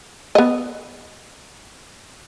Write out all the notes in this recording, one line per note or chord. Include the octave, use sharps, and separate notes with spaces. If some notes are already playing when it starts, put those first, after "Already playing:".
B3 D#5